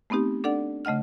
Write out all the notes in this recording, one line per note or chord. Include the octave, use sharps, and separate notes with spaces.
A3 B3 C4 D#4 G4
D4 A4 D5 F#5
C#3 A3 D#5 F#5 F6